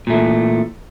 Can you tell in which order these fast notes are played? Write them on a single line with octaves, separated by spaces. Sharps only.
A#2 A3 E3